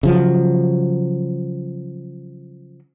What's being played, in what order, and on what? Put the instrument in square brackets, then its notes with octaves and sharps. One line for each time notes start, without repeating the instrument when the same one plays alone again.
[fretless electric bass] C#3 F3 F#3